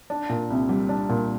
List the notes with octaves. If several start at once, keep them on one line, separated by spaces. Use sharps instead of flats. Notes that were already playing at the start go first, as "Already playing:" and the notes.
D4
A#2
C2
G3
D4
A#2